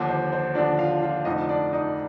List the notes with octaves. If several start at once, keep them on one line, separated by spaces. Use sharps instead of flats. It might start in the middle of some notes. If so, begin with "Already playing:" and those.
Already playing: D#2 D3 F3 D4 D5
C5
C5
D#2 D3 F3 D4 D5
F4 F5
F4 F5
F1 F2 D3 F3 D#4 D#5
D4 D5
D#4 D#5